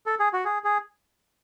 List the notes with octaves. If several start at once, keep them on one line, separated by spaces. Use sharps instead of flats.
A4
G#4
F#4
G#4
G#4